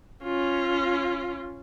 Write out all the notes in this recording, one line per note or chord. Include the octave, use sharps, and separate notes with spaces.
C#4 F4